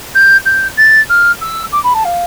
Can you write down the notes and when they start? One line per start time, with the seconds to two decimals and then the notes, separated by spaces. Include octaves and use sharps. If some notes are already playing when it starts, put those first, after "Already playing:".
0.15 G6
0.45 G6
0.77 A6
1.09 F6
1.41 E6
1.72 D6
1.83 B5
1.94 A5
2.04 F5